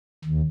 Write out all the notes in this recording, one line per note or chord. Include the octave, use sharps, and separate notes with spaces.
D#2